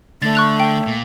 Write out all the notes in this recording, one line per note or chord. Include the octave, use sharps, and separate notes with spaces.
D3 A3 D4 A6
C#6 F#6 F7
G5
A#2